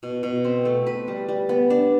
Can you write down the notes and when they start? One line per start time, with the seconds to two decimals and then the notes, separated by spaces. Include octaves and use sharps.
0.03 B2
0.23 B2
0.44 C4
0.65 A3
0.87 B4
1.08 G3
1.29 G3
1.49 B3
1.70 D4